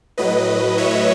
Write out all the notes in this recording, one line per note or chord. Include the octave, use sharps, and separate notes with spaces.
A2 F#3 B4 D#5
C#5 E5